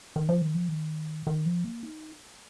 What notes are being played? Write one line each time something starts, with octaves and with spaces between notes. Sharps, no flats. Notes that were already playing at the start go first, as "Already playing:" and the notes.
D#3
F3
D#3
F3
D#3
D#3
F3
A#3
D#4